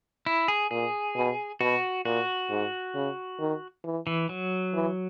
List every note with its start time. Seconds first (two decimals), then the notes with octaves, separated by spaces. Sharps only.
0.26 E4
0.48 G#4
0.71 A#2 G#4
1.16 B2
1.60 B2 F#4
2.05 A#2 F#4
2.50 G#2
2.95 C#3
3.39 D#3
3.84 E3
4.07 E3
4.29 F#3
4.74 E3